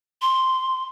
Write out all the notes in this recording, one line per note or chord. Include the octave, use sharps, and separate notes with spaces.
C6